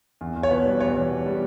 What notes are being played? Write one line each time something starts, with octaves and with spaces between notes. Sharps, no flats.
E2
E2
C#5
B2 B4
G3
E2 C#5
E2
B2
G3